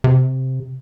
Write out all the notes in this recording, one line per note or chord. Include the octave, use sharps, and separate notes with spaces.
C3